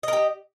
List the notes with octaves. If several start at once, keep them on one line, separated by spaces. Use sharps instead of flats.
G4 A#4 D#5